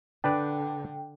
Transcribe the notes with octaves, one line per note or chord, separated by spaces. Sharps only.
D3 D4 B4 D5 G5